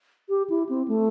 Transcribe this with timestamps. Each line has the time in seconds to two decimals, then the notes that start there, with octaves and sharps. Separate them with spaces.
0.29 G4
0.50 E4
0.69 C4
0.88 A3